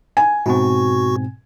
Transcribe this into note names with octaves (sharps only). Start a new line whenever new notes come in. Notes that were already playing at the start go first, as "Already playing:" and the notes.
G#5
G#2 B2 C4 F#4 C#6